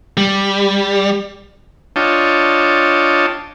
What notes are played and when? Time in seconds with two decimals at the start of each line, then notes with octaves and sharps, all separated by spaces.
0.17 G3
1.96 D4 F4 C#5 D#5 G5 A5